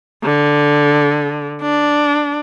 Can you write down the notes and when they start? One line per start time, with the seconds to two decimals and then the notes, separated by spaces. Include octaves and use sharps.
0.24 D3
1.62 D4